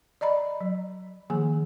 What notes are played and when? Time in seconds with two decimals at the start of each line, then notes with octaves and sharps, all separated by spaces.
0.21 D5 D#5 A#5 B5
0.60 F#3
1.30 D#3 F3 A#3 G#4 G#5